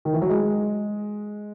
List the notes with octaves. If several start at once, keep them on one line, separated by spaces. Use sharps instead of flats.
D#3
E3
F#3
G#3